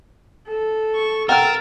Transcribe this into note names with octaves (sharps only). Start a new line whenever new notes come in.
A4
C#6
A#4 F#5 G5 E6 F6 A6